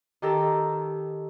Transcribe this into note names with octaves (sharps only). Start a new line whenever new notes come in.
D#3 G4 A4 A#5 E6